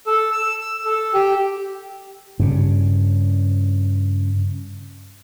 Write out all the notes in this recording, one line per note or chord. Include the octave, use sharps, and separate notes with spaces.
A4
E6
A4
G4
G2 C#3